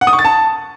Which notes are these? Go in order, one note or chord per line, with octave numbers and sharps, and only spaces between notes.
F#5
D#6
C#6
A6
A5